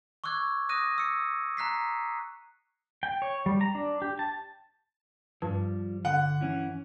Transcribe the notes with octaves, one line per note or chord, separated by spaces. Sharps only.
C#6 D6 E6 F#6 G#6
D#6 F#6 A#6 D#7
E6 C#7
A#5 F#6 B6 C7
G5
C#5
G3
A#5
D4
G4
A5
G2 F3 G3
D3 F#5
E3 C#4 E4